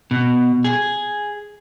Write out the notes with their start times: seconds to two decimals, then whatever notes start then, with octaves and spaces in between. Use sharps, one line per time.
0.11 B2
0.64 G#4